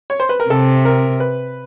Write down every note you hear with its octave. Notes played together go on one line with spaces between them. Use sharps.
C#5
C5
B4
A#4
C3 A4
A#4
B4